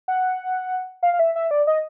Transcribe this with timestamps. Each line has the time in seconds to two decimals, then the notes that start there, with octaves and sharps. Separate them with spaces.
0.08 F#5
1.03 F5
1.14 F5
1.19 E5
1.36 E5
1.51 D5
1.67 D#5